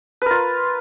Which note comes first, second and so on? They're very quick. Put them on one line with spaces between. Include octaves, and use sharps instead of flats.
B4 A#4 F4